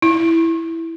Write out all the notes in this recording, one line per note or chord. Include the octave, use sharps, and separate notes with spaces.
E4